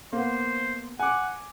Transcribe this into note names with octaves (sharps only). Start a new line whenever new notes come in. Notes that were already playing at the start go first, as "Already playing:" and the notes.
A#3 B3 C5
F#5 G#5 D6